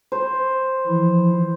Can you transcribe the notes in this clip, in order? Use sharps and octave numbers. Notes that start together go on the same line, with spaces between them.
C5
E3 F3 E4